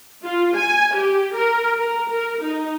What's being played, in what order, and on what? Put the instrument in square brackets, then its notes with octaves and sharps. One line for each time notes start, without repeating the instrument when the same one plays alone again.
[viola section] F4
G#5
G4
A#4
A#4
A#4
D#4